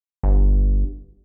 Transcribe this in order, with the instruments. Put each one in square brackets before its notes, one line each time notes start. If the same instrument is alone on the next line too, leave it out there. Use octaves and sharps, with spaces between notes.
[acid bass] G1